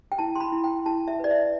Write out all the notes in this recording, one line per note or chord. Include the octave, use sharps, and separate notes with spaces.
G5
E4 A5
C6
B5
E4
G5
E4 A5
E5
B4 D5
E5